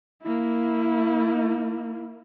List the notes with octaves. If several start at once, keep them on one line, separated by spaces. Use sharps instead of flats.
A#3 E4